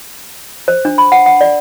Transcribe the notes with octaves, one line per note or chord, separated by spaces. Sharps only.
C5
D4
B5
F#5
F#5
D5